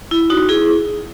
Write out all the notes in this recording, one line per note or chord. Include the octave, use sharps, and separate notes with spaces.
E4
D#4 F#4
E4 G#4